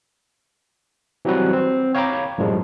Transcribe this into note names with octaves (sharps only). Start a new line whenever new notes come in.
E3 F#3 G3 C4 F#4 B4
C4
C#5 F5 G5 A#5 B5 D6
F#2 A2 F3 G3 G#3